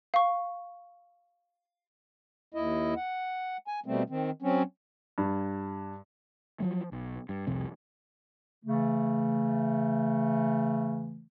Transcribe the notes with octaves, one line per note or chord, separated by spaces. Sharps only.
F5 C#6
D#2 E4 D#5
F#5
G#5
B2 G3 A3 C4
D#3 C4
F#3 C4 C#4
G2
F3 F#3 A3
B1
G2
C2 F2 C3
C#3 E3 A3